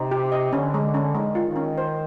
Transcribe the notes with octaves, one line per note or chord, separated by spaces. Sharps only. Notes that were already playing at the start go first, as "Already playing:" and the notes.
Already playing: C3 D#4
G4
D#5
D3 C#4
G#3
C#4
D#3 G#3
F4
D#3
C#4
C5